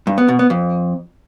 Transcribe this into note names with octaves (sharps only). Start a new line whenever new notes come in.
G2
B3
B2
B3
F2